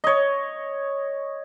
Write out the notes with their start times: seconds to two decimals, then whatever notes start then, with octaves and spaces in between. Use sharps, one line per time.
0.04 C#5 D#5